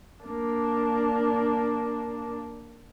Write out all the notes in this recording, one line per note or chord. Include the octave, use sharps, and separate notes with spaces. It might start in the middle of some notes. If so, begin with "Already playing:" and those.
A#3 D4